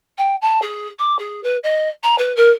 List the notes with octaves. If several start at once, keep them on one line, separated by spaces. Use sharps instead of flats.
G5
A5
G#4
D6
G#4
B4
D#5
A#5
B4
A#4